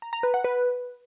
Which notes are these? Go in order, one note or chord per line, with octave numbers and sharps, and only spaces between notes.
A#5
A#5
B4
F#5
B4